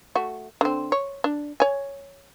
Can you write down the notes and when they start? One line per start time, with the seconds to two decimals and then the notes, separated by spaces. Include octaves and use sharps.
0.15 A3 F#4
0.61 D3 C4
0.92 C#5
1.24 D4
1.60 C#5 G#5